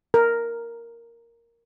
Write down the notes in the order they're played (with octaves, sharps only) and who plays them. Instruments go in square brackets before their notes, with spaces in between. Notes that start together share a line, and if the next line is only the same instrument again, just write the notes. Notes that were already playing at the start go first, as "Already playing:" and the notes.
[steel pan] A#4